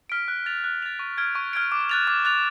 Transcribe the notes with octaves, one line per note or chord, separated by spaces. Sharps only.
F6 B6 D7
F#6
A6 F7
F#6
A6 F7
C#6
F6 G#6 D7
C#6
F6 G#6 D7
D6
F#6 A6 F7
D6
F#6 A6 F7